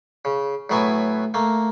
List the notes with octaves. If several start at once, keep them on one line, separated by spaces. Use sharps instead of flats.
C#3
A2 F#3 B3 E4 G#5
A3 A#3